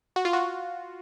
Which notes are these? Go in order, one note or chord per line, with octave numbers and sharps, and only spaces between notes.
F#4
F4
F#4